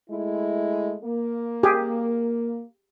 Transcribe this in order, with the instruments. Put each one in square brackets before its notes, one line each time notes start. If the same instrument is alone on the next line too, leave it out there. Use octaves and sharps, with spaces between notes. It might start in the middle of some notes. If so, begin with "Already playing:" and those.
[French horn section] G#3 A3 E4
A#3
[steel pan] G4 G#4